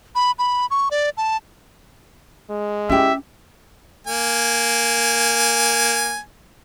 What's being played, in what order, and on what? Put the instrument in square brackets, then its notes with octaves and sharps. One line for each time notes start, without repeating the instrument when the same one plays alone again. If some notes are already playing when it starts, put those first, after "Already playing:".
[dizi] B5
B5
C#6
D5
A5
[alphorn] G#3
[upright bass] C#4 [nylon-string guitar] E4 G4 [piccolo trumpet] E5
[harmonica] A#3 G#5